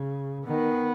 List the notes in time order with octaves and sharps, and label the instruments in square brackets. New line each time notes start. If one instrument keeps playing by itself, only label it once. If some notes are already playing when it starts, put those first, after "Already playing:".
Already playing: [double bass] C#3
[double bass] D#3 [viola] B3